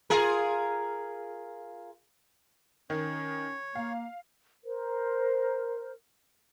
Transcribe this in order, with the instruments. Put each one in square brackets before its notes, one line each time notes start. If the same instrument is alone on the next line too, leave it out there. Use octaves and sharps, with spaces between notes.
[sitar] F4 G#4 A#4
[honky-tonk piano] D#3 [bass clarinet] C#4 [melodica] C#5
[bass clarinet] A#3 [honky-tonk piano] F5
[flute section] A#4 C5